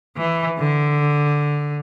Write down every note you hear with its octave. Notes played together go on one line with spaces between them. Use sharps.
E3
D3